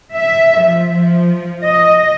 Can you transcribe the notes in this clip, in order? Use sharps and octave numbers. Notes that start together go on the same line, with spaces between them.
E5
F3
F3
D#5